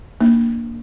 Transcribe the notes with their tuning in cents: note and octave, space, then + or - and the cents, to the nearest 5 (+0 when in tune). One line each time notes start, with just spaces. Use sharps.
A#3 +0 D4 +0